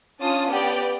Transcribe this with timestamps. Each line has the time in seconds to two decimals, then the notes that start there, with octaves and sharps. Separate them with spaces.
0.20 C#4 D4 F4 A5 D#6
0.51 B3 G4 B4 D5 G5